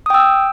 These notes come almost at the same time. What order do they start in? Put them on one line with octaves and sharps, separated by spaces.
D#6 G5 E6